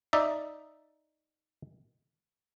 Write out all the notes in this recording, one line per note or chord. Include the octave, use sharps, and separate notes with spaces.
D#4 D5 E5